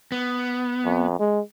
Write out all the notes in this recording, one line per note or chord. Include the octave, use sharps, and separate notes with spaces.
B3
F2
G#3